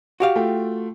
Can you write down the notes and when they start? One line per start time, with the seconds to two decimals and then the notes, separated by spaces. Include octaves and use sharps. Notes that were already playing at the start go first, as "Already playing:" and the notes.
0.20 F#4 G4 F5
0.36 A3 F4 G5